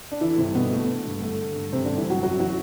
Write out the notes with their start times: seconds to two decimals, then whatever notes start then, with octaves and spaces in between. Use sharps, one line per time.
0.12 D4
0.21 D3 E3 E4
0.38 G2 C3 C4
0.55 B2 D3 B3
0.71 D3 A3
0.89 D3
1.05 G2
1.22 D3 A3
1.39 D3
1.56 G2
1.73 G2 C3 C4
1.85 G2 D3 D4
1.97 E3 E4
2.06 D3 F#3 F#4
2.23 F#2 F#3 F#4
2.40 E3 F#3 F#4